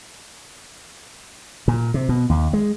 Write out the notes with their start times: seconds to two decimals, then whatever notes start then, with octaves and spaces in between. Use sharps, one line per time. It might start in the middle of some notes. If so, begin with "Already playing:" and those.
1.68 A#2
1.94 C3
2.09 B2
2.30 D#2
2.53 G#3